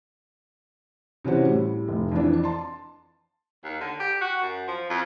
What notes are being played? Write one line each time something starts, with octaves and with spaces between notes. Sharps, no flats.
C3 E3 C#4 F#4 C5
A2 G3
F1
F2 E3 D4
A5 C6
D#2
D3
G4
F#4
F#2
F3
F2